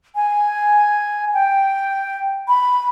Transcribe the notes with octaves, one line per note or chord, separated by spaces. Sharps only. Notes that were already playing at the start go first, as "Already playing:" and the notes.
G#5
G5
B5